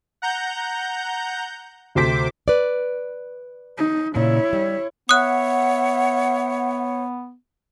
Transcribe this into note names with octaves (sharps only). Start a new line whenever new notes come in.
F#5 A#5 G6
D2 C3 C5 D6 B6
B4 D5
D#4
A#2 C#3 E4 C#5
G3
B3 C#5 E5 F#5 D#6 F#6